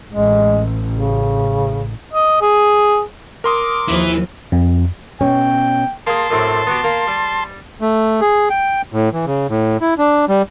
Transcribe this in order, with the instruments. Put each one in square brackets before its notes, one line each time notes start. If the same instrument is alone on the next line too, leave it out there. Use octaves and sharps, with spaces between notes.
[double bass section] A1 [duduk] G#3
[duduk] C#3
[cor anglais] D#5
G#4
[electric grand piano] A#4 C6 D#6 [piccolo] D6
[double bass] D#2 F3 [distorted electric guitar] E3 E4
[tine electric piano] F2
[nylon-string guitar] B2 C#4 C#5 [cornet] G5
[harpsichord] A#3 G#4 [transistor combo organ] A5 C6
[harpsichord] F#2 A2 C4
B3 F#4 G4
A#3
G3
[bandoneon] A3
G#4
G5
A2
E3
C#3
A2
E4
D4
G3